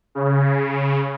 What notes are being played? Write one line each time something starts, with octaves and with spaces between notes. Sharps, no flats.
C#3